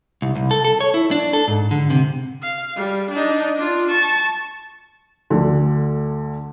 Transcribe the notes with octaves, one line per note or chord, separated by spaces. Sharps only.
C2
C2
A4
A4
C#5
E4
D4
A4
G#2
D3
C3
F5
G3
D4 D#4
D4 F4
A5 C#6
D2 D3